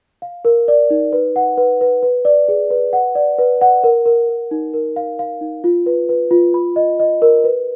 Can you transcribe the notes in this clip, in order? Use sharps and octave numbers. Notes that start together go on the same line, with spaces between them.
F5
A#4
D5
D#4
B4
F#5
B4
B4
B4
D5
G#4
B4
F#5
D5
B4
F#5
A#4
A#4
A#4
D#4
A#4
F5
F5
D#4
F4
B4
B4
F4
B5
D#5
D#5
A#4
B4